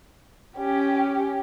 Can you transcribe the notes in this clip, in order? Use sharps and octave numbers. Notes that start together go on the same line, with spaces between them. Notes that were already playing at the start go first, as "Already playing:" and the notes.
C#4 G4